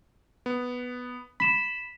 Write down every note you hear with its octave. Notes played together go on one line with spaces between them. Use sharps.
B3
B5 B6 E7